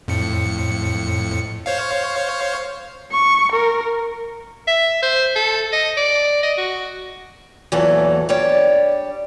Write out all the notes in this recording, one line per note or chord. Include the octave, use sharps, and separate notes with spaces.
F2 A2 C#7
C5 C#5 F5
C#6
A#4
E5
C5
A4
D#5
D5
D#5
F#4
E2 A#2 E3 F#3 A4 A5
G3 D4 C#5 D5